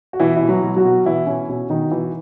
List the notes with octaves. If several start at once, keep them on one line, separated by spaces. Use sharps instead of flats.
F#4
B2 E3 E4
B2 E4
F#3 F#4
B2
F#3 F#4
B2
B2 E3 E4
B2 C#4
B2 C#4
B2 D#3 D#4
B2 E3 E4